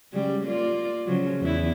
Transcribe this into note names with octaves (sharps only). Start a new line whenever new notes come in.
C#3 F#3 G3
A#3 F4 D5
C#3 F3 F#3
E2 B3 E4